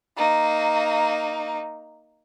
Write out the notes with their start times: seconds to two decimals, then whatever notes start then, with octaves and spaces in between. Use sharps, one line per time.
0.17 A#3 D#4